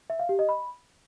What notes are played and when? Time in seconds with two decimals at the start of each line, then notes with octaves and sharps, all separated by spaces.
0.10 E5
0.19 F5
0.29 G4
0.39 D#5
0.49 B5